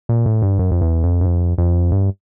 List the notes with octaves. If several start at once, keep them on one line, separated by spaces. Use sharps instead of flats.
A#2
A2
G2
F#2
F2
E2
F2
F#2
F2
F2
G2